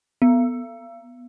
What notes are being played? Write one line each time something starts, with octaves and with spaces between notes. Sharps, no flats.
B3